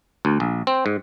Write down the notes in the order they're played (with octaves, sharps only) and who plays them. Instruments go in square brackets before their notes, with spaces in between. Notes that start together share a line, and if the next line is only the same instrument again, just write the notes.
[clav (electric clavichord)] D2
A#1
C4
G#2